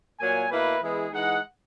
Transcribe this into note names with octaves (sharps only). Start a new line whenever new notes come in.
A#2 F#3 A#3 G#5
B2 A#3 E4 B4
E3 G#3 B3 E4 G#4
E3 G#3 D#4 F#5